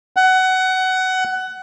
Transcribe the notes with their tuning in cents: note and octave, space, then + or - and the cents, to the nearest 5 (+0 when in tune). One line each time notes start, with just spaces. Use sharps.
F#5 +20